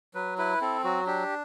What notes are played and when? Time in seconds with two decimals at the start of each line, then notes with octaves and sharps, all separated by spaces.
0.14 F#3 B4
0.38 E4 B4
0.61 C4 A4
0.84 F#3 F#4
1.07 D4 G4